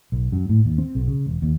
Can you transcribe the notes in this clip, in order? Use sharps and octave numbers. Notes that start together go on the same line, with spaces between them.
B1
F#2
A2
D#2
C4
B1
C#3
E1
D#2